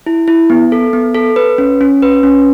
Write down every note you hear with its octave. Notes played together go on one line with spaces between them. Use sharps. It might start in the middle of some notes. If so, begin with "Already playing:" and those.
E4
E4
B3
A4
B3
A4
B4
C#4
C#4
B4
C#4